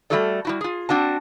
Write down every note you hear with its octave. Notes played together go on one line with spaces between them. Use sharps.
G3 A3 A#3 F#4 A4 D5
G3 E4 F#4
F4 G#4
C4 D4 F#4 A5